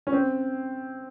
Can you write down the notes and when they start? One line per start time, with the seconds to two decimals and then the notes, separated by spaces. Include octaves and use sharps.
0.07 C#4
0.13 C4